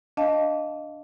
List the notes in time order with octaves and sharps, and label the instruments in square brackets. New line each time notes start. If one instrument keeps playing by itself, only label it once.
[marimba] D4 D#5 F5 A5